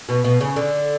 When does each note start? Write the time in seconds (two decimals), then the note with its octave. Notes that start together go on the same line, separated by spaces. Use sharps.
0.09 B2
0.24 B2
0.41 C#3
0.56 D3